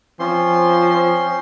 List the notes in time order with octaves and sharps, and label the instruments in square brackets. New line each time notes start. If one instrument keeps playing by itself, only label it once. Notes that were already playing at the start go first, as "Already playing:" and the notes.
[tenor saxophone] F3 [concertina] C4 C#4 C6